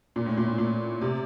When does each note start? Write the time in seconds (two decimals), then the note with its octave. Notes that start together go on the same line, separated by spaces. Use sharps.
0.16 A#2
0.26 A2
0.37 A#2
0.48 A2
0.58 A#2
1.01 C3